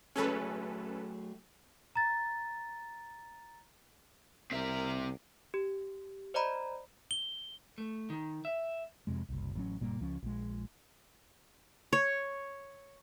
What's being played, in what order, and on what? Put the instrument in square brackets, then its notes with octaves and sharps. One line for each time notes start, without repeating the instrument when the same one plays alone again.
[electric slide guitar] F#3 A3 G#4 [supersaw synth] C#4 A4 B4
[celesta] A#5 A6
[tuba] C2 [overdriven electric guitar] C4 E5 [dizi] A#4
[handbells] G4
C5 D5 D#5 A#5 B5
[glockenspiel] G7
[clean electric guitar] A3
D#3
E5
[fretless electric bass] F2 C3 G#3
F#1 C2
A1 F#3 C#4
F#1 A#2 G3 A#3
C#2 F3 C#4
A#1 G#3
[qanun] C#5